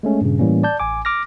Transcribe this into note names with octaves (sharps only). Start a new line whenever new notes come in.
G#3 A3 C#4
G2 A#2 C#3
A2 E3 G3 A#3 C#4
D5 A5 G6
A1 G#5 D6
D6 F6 A#6